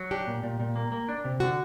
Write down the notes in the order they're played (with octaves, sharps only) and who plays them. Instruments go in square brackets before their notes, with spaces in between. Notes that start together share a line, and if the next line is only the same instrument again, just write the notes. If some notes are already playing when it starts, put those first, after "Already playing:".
Already playing: [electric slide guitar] F#3
[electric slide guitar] D4 [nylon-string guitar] G4
[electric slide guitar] A#2
A#2
A#2
A#3
A#3
D4
C3
[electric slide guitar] D3 [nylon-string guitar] F#4